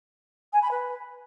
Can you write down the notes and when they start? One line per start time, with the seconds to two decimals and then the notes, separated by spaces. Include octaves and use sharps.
0.53 G#5
0.62 B5
0.71 B4